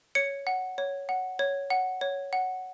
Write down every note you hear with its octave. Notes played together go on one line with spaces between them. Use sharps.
C#5 C#7
F#5
C#5
F#5
C#5
F#5
C#5
F#5